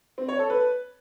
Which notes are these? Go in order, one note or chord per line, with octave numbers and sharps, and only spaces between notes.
C4
C#5
A4
B4